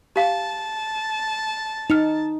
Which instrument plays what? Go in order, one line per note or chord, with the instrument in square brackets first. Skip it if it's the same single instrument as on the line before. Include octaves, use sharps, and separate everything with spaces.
[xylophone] G4 F5 [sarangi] A5
[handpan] D#4 [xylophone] F6 C#7 F7